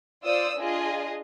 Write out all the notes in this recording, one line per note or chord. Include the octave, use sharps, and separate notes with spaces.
F4 C5 D5 D#6 E6
D4 F4 G#4 D#5